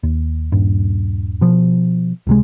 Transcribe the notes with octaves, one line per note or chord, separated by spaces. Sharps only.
D#2
D#1 G2
B2 F3
C#2 C3 G#3